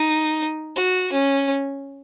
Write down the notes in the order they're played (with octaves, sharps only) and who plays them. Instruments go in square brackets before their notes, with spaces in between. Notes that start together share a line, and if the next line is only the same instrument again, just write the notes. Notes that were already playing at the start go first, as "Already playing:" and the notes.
Already playing: [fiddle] D#4
F#4
C#4